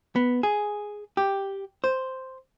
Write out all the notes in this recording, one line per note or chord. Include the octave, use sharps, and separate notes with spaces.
B3
G#4
G4
C5